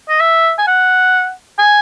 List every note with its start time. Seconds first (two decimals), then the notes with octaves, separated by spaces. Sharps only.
0.09 D#5
0.20 E5
0.59 G#5
0.67 F#5
1.59 G#5